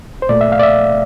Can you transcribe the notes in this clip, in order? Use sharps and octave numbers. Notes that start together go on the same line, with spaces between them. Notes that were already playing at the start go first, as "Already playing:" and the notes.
C5
A#2 A3 D5
E5
F5
D5
E5